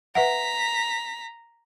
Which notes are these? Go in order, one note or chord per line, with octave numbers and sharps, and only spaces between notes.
B4 E5 F#5 A#5 B6